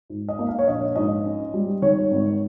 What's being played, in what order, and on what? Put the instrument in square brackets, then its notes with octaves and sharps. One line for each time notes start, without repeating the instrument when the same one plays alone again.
[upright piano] G#2
D#5
A#3
F5
C#5
A#1 D#5
G#2 D#5
C#4
G3
D#3 C#5
G#1